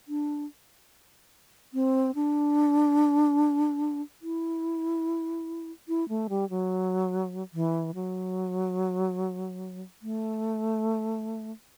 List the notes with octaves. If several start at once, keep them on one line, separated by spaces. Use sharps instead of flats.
D4
C4
D4
E4
E4
A3
G3
F#3
E3
F#3
A3